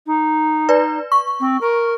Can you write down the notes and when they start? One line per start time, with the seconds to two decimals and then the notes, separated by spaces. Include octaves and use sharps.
0.06 D#4
0.69 B4 D5
1.12 C#6
1.40 C4
1.61 A#4